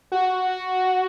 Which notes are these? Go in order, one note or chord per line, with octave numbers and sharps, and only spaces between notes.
F#4